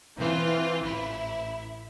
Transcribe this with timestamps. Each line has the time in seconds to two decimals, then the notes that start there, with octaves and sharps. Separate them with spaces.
0.16 E3 C4 F4
0.84 A1 E4